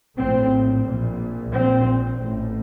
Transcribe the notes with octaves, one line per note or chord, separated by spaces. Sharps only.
A#1 A2 C4
A#1 A#2
A#1 A#2 C4
A1 A2